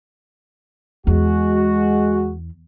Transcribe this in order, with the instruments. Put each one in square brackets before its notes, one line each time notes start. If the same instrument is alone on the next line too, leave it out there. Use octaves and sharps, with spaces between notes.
[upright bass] E2 [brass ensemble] G#3 F#4